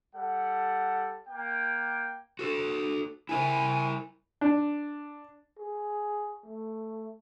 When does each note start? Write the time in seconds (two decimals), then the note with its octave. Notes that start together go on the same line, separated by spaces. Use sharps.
0.15 G3 A4 F#5
1.29 A#3 G5
2.39 F#4 A4
3.29 E4 A#4 E5 G#5
4.41 D4
5.59 G#4
6.46 A3